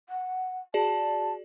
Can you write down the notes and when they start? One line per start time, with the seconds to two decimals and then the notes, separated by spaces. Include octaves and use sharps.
0.09 F#5
0.74 F#4 G#4 D5 A5